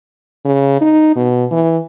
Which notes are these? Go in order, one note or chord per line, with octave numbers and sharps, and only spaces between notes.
C#3
D#4
B2
E3